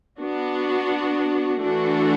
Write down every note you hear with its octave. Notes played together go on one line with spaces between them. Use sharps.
B3 D4 F#4
E3 A3 D4 F#4 A4